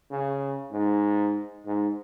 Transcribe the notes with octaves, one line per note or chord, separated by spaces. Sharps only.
C#3
G#2
G#2